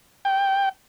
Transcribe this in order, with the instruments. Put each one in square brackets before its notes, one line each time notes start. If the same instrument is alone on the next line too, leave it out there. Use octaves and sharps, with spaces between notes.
[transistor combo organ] G5